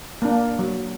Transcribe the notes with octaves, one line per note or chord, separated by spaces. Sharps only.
A#3 D4
F#3